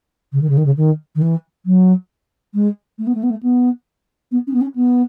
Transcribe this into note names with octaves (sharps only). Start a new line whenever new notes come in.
C#3
D#3
C#3
D#3
C#3
D#3
D#3
E3
F#3
G#3
A3
B3
A3
B3
A3
B3
B3
C#4
B3
C#4
B3